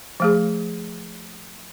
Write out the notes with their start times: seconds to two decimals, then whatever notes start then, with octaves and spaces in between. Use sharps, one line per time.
0.20 F3 A3 G#4